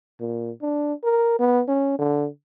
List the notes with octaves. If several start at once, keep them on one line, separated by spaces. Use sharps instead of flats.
A#2
D4
A#4
B3
C#4
D3